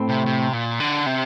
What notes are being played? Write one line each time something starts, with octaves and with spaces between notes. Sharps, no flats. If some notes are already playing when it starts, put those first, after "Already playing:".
Already playing: A2 A3 C4
C3
C3
A#2
D3
C3